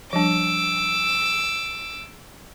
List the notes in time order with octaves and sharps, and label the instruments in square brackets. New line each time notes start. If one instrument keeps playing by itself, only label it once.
[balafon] F3 G3 D4 [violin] D6 E6